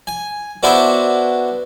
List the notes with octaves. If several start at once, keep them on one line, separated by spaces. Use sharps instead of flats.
G#5
B3 D4 E4 F#4 C5 E5